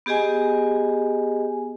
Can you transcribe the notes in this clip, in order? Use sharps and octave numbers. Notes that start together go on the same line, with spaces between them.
B3 G4 G#4 D#5 G#5